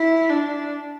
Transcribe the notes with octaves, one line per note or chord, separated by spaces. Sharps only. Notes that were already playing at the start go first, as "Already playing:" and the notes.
Already playing: E4
D4